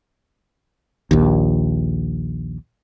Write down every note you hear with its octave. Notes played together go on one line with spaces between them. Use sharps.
A#1 D#2